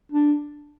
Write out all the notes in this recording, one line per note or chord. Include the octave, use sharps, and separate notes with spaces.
D4